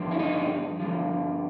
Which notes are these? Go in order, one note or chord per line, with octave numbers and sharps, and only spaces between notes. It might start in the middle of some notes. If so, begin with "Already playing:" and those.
Already playing: G2 D3 F3
E4
D#4
G2 D3 F3